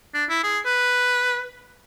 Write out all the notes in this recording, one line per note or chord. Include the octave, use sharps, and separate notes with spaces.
D4
E4
G#4
B4